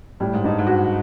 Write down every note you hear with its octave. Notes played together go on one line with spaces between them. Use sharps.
A2 G3
G#2
G2 D#4
G#2
F#4